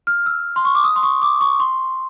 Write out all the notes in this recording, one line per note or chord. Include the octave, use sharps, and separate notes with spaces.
F6
E6
C6
C#6
D6
D#6
C6
C#6
D6
C#6
C6